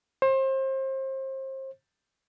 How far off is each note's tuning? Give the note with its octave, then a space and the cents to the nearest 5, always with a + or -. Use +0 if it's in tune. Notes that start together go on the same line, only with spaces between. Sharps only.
C5 +30